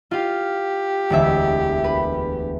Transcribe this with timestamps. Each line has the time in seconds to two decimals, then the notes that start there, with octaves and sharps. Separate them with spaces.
0.11 F4 G4 F5
1.10 E1 D2 E5
1.84 B4